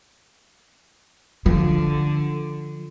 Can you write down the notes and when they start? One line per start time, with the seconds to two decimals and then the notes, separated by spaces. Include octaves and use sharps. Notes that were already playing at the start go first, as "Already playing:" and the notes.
1.46 D3 F3